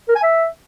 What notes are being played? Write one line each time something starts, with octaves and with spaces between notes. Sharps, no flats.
A#4
G#5
E5